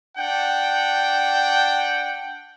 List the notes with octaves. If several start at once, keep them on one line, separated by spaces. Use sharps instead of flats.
D4 F#5 G5